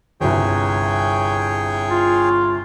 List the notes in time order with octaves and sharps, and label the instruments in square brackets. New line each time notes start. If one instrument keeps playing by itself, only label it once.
[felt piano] G1 C2 [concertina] G#4 C#5 G5
[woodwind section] F4